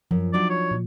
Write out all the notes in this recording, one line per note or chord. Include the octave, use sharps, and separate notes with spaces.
F#2 F3
F#3 D4 D#4 D5
C#5
A#2